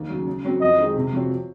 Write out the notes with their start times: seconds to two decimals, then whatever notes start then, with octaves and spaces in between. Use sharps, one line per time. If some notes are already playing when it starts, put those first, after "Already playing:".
Already playing: D#2
0.09 C#3 F#3
0.27 C#3
0.44 F#3 C4 F#4 C#5
0.61 F2 D#5
0.78 D#3 G#3 D#4 G#4
0.96 C3
1.13 F3 C4 F#4 C#5